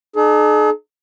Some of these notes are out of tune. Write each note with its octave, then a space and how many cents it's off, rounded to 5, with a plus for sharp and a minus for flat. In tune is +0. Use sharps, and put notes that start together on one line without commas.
D#4 -40 G#4 +45